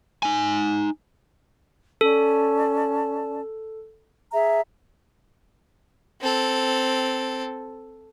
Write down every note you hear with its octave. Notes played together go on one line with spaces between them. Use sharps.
D#4 G#5
C#4 A4 D5 A5
G#4 E5 A#5
C4 A4